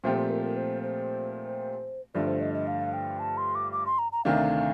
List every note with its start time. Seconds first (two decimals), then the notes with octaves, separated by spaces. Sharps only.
0.04 A#2 F3 A3 C4 G4 C5
0.18 C5
0.30 A#4
0.44 A#4
0.57 C5
0.83 C5
2.14 G2 D3 F3 A3 D5
2.27 C5
2.41 D#5
2.54 D#5
2.67 F5
2.93 G5
3.19 A5
3.37 C6
3.55 D6
3.72 D6
3.86 C6
3.99 A#5
4.12 A#5
4.25 D2 C3 D#3 A3 D4 F5